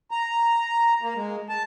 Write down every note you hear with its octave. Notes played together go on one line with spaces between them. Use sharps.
A#5
A#3
G#3
A5